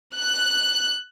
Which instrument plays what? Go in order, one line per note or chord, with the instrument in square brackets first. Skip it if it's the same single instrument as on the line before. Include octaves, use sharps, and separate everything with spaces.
[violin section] F#6